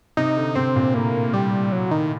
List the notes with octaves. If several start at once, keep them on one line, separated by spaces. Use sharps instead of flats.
C3 D#4
D3
C3 C4
A#2
A2 A#3
G3
F#3
D#3